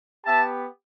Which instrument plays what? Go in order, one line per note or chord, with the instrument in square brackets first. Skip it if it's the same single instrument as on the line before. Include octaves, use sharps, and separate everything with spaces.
[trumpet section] B3 G4 E5 A5